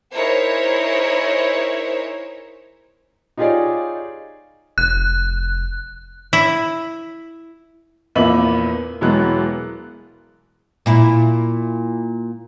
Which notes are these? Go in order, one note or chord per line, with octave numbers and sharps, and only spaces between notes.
D#4 E4 G#4 A#4 C5 C#5
D#4 F4 G4 G#4 C#5 D5
F1 F#6
E4
A#1 E2 A#3 B4 E5 F#7
E1 E3 F#3 G#3 B3 F#6
A#2 E4